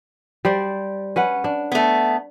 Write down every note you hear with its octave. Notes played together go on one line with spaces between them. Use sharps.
G3 C5 D5
C#4 B4 F#5
D4
A3 B3